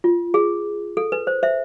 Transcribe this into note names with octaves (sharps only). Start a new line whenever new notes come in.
F4
G#4
A4
B4
C5
C5 E5